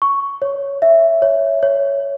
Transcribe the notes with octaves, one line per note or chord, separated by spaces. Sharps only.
C#6
C#5
E5
C#5
C#5